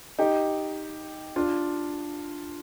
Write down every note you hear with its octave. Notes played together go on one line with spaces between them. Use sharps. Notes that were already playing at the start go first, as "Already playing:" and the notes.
D#4 G4
D4 F4